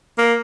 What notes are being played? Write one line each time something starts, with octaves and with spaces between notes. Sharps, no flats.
A#3